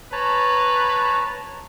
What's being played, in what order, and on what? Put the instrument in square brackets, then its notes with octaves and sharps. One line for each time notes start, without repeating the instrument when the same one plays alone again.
[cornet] B4 [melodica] C#5 A5 A#5